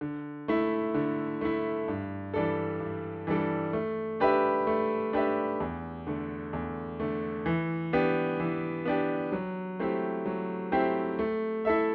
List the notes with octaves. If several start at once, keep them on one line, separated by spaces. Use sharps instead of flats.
D3
A3 E4
D3
A3 E4
G2
E3 G3 D4 A4
G2
E3 G3 D4 A4
A3
D4 G4 B4 E5
A3
D4 G4 B4 E5
E2
D3 A3
E2
D3 A3
E3
B3 D4 G4
E3
B3 D4 G4
F#3
A3 C4 E4 G4
F#3
A3 C4 E4 G4
A3
E4 A4 E5